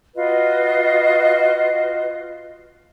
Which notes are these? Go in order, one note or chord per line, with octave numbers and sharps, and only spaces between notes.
F4 F#4 B4 D#5